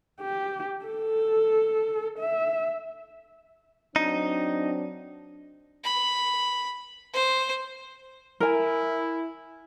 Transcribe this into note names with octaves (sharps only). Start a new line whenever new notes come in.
G4
A4
E5
F#3 C4 D4 D#4
B5
C5
E4 A#4 G#5